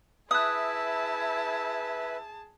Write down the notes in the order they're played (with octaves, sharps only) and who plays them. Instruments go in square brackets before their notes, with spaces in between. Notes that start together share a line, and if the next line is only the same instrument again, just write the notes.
[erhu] E4 [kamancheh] G#4 A5 [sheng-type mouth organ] B4 E5 [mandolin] D#6 F#6